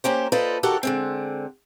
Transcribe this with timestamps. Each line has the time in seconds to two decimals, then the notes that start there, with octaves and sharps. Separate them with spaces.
0.04 A#3 C#4 G4 C5
0.32 F4 A4 B4 C5 D5 D#5
0.63 D#2 F#4 G4 A4 A#4 F#5
0.83 D3 G#3 C4